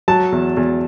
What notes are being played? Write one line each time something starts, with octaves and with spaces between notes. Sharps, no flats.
F#3 A5
E2
E2